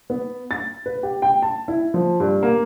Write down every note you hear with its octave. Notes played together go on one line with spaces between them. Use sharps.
B3
A6
B4
G4
G5
A5
E4
F3
G2
A#3